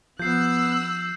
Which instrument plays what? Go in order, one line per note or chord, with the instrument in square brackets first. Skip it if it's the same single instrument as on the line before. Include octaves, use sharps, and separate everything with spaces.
[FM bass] F3 [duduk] B3 [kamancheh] E6 F#6 [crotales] G6 C7